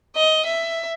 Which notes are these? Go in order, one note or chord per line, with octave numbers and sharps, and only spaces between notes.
D#5
E5